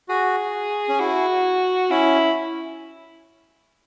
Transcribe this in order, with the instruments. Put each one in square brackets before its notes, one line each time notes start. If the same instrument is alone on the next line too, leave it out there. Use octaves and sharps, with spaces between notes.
[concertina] F#4 [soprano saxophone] G#4
[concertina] C#4
[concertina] E4 [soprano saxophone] F#4
[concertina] C#4 [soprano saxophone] E4